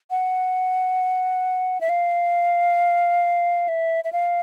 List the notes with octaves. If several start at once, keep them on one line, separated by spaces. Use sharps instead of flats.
F#5
E5
F5
E5
E5
F5